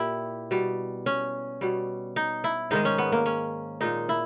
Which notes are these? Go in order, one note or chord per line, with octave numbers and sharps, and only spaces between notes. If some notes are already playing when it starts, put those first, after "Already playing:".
Already playing: A#2 E4 G4
B2 G3
C#4
B2 G3
D#4
E4
G#2 D#3 G#3 D#4
C#4
B3
A#3
C#4
A#2 G#3 D#4
E4